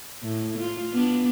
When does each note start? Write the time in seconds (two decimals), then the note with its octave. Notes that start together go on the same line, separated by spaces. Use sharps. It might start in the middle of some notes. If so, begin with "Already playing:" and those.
0.23 A2
0.58 F4
0.93 B3 D4